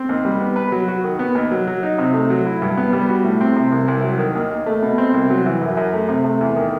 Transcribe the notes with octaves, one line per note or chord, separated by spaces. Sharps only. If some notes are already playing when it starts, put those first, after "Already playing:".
Already playing: C4
D#2
G3
B3
B4
F#3
F#4
D#3
B3
D#2
F#3
F#3
D#4
C3
A3
F#3
E4
G2
B3
G3
F#4
A2
C4
C3
C2
C2
F#3
D#3
D#2
D#2
A3
B2
C4
C2
F#3
E3
F#2
F#2
A3
C3
A3
E2
D#3